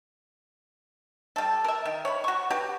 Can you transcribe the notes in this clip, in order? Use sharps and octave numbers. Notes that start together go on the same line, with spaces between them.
G3 A4
A#4 E5
D#3
C#5 B5
F#4 C#6
F#4 G4 B4